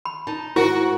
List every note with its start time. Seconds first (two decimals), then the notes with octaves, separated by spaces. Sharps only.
0.05 B5
0.27 D#4 A5
0.56 G#2 E4 F#4 A#4 C5